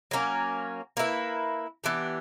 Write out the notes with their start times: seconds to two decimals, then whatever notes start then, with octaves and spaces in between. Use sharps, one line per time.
0.11 F#3 A#3 C#4
0.97 A#3 E4 B4
1.84 E3 B3 D4 G4